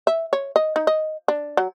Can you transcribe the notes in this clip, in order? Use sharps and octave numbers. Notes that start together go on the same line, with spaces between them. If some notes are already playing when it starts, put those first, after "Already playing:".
E5
C#5
D#5
D#4
D#5
D4
F#3